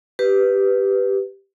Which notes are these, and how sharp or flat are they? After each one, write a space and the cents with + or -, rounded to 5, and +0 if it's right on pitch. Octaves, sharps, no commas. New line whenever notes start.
G4 +0 B4 +0